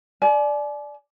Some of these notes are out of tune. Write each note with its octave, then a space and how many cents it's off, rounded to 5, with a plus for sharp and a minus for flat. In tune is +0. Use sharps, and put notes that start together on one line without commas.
D5 +0 G#5 +45